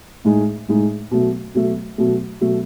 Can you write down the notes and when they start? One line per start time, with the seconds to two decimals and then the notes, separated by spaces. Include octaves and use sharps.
0.25 A2 G#3 D#4
0.69 A2 G#3 D#4
1.11 B2 F#3 A3
1.54 B2 F#3 A3
1.98 B2 F#3 A3
2.41 B2 F#3 A3